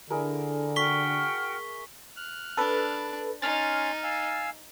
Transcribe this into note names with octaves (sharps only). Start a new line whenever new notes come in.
D3 E4 G#4 A#4
F#4 G5 C#6 F6 B6 G7
F6 F#6
D4 A4 B4
C#4 D#4 G#5 C6 F6 A6
F5 G#5 E6